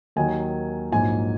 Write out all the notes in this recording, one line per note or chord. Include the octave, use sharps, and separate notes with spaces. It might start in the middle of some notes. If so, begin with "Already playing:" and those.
D#2 D#3 F#3 G#5
A#1 G#2 F#3 G#5